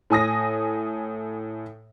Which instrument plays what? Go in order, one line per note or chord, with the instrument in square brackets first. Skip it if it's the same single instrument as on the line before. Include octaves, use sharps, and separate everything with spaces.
[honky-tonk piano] A2 G#5 D#6 A#6